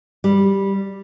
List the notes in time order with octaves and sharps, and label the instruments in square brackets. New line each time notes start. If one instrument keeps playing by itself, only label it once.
[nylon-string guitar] G3